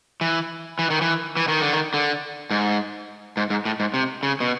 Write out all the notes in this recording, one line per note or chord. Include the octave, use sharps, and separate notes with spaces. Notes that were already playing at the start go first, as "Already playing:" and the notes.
E3
E3
D#3
E3
E3
D#3
D3
D#3
D3
G#2
G#2
G#2
A2
G#2
C3
C#3
B2